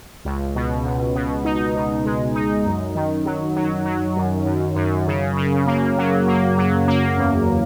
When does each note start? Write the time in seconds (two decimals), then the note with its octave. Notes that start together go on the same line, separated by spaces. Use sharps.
0.25 C#2
0.55 B2
0.85 C#2
1.15 B2
1.45 D#4
1.75 B2
2.05 G#3
2.35 D#4
2.66 F#2
2.95 D#3
3.25 F#3
3.56 F#3
3.85 F#3
4.16 F#2
4.46 F#2
4.76 F#2
5.07 C#3
5.37 C#3
5.66 A#3
5.97 F#3
6.28 A#3
6.58 F#3
6.88 A#3
7.18 E2